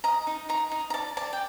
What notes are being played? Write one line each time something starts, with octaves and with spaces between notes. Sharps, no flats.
D#5 A#5
D#4
D#4 A#5
D#4
A#5
D5 A5
D5 A5
G5